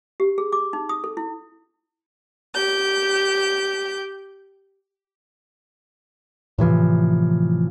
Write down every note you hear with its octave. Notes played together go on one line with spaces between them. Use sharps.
G4
G#4
D6
D#4
D#6
A4
E4
G4 G6
A2 C3 E3 F3